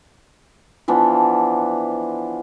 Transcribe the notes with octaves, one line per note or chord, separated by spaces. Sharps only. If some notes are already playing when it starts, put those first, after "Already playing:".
E3 F3 B3 D4